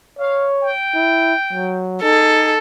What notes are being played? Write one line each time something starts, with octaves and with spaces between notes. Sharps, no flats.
C#5 F5
G5
E4
F#3
D#4 G#4 A4